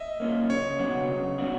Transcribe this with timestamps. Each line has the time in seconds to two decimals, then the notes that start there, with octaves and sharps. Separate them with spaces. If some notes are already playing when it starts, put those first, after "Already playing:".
Already playing: D#5 E5
0.20 A#3 C#4 F4
0.49 C#3 C#5
0.79 F#3 B3 D4 F#4
1.09 C#3
1.38 F#3 B3 D4 F#4